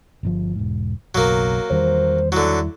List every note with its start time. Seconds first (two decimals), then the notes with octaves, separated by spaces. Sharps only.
0.23 G1 C3 F3
0.56 E1 G#2
1.15 F#1 B1 F#3 A#3
1.71 E2 D#3 G3 C5
2.32 D3 F#3 E4